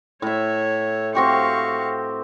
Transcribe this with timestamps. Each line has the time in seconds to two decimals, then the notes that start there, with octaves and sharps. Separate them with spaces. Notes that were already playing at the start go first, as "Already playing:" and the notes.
0.22 A2 C#5 E5
1.15 C4 F#4 G4 F5 C#6